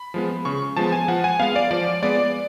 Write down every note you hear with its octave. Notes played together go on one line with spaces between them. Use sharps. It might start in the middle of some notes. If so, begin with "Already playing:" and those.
Already playing: B5
F3 G#3 B3
C#3 C#6
F3 G#3 B3 A5
G#5
F3 F#5
G#5
G#3 B3 F5
D5
F3 D5
G#3 B3 D5